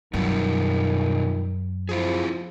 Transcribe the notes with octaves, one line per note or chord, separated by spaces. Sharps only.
F#2 B2 D#3 G3 F4
F3 E4 F4 G#4